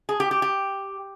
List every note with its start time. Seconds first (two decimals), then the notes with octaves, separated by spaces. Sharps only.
0.09 G#4
0.20 G4
0.31 G4
0.42 G4